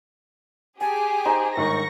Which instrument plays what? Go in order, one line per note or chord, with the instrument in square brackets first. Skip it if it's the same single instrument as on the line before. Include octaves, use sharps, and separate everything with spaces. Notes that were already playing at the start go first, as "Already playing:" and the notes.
[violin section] G4 G#4 [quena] G#5 [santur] A5
[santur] D#4 [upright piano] C5
[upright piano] G1 G#2 D#3 [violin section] C#6 A#6